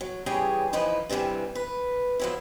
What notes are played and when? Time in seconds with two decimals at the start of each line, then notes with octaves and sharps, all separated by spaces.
0.01 F#3
0.26 C#3 E3 G3 G#4 C#5 G5
0.73 E3 F3 D#4 E4 B4
1.09 G2 C3 D#3 E3 G3
1.55 B4
2.20 F3 F#3 E4